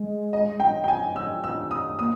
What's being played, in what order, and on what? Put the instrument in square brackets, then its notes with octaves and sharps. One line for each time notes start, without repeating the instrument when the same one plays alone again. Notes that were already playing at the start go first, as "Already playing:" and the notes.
Already playing: [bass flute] G#3
[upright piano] D#5
G5
G5
G#5
E6
E6
D#6
[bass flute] A#3 [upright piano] D#6